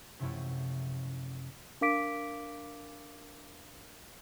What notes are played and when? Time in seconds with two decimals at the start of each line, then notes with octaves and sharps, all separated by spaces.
0.19 F#2 C3 F3 A3 E4
1.81 D4 A#4 F5 D6 B6 D7